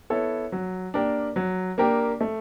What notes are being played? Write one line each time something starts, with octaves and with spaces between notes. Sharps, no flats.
B3 E4 A4 C#5
F#3
A#3 D4 G4 A#4
F#3
A#3 D4 G4 A#4
A3